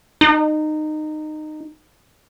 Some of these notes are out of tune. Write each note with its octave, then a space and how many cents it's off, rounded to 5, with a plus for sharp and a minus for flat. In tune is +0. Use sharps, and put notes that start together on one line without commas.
D#4 -20